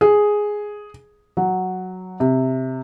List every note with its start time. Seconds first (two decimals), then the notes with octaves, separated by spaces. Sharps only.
0.01 G#4
1.37 F#3
2.20 C3